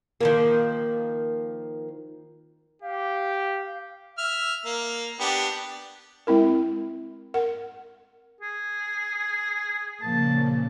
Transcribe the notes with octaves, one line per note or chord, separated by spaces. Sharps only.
D#3 F3 A#3
G4 F5
E5 F6
A#3
B3 D4 G4
G#3 C4 E4 A#4
A#4 F#5
G#4
A#2 C#3 F3 A#3 A5